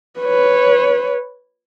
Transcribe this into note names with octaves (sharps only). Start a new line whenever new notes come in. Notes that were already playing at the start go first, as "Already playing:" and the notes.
B4 C#5